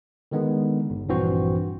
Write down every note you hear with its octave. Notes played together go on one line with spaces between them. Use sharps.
D3 D#3 G#3 B3
G1
A#1 G2 E3 C4 F#4 C5